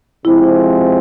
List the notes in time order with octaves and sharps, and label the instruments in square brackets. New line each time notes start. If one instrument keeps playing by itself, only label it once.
[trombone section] C3 F3 G#3 C4 [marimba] E4